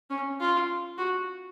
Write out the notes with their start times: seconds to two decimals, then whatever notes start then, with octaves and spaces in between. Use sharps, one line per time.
0.10 C#4
0.40 F4
0.98 F#4